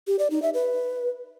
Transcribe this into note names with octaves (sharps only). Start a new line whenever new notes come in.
G4
D5
D#4
E5
B4